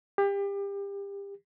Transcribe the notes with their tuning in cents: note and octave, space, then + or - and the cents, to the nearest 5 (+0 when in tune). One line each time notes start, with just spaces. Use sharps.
G4 +30